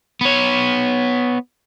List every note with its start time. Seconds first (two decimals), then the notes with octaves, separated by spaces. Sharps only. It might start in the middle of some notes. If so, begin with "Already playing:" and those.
0.21 B3 C#5